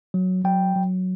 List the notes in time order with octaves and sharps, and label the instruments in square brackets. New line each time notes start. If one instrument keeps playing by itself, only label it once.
[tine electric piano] F#3
F#3 G5
F#3